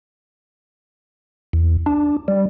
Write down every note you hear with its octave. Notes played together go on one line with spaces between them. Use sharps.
E2
D4
G3